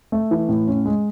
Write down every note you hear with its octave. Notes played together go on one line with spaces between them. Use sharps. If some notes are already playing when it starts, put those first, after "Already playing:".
A3
E3
A2
C#4
G#3